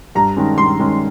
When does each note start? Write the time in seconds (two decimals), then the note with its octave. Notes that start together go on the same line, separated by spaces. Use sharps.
0.15 G2 A#5
0.37 D#3 G#3 C#4
0.58 G2 C6
0.79 D#3 G#3 C#4